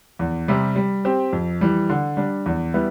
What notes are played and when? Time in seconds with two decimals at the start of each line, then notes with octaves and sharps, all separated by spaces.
0.19 E2
0.48 C3 G3
0.76 G3
1.05 C4 G4
1.33 F2
1.61 E3 G3
1.90 D3
2.17 G3 D4
2.46 E2
2.74 G3 B3 E4